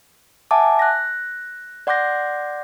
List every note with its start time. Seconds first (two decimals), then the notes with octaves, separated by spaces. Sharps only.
0.51 E5 F#5 G#5 A5 D6
0.79 F#6 A#6
1.87 D5 F#5 C6 D6 G6 A#6